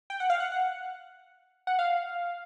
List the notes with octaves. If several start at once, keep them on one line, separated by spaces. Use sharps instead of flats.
G5
F#5
F5
F#5
F#5
F#5
F5